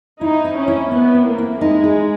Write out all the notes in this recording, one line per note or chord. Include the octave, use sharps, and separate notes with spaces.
D#4 E4
C4
C#4
E4
B3 C4
C4
A#3
E4
G#3 D#4
G#4